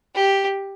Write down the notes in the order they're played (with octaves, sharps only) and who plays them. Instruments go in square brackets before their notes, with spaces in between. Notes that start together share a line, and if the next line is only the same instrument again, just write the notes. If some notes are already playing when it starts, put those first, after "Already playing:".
[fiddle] G4